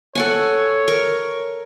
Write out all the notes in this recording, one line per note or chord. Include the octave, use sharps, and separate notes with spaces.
A4 C#5 F#5 G#5
A#4 C#6